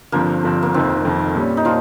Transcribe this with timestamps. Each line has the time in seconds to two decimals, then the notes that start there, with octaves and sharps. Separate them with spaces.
0.12 G1 G2 F3 A#3 C4
0.43 G1 G2 F3 C4
0.62 A#3
0.74 F1 F2 D#3 C4
1.04 F1 F2 D#3
1.35 A#2 G3 C#4
1.57 D#4
1.65 A#2 F3 F4